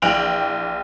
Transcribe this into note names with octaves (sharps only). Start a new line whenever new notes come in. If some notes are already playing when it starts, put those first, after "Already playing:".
A#1 E3 G5 D7 F7 F#7